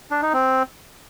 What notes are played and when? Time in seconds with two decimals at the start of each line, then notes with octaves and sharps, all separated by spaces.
0.11 D4
0.22 D#4
0.33 C4